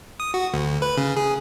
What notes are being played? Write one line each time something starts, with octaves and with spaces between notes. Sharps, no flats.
D#6
F#4
D2
B4
C#3
G#4